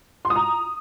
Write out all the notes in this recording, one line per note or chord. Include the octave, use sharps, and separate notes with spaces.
C6
D#6
A#5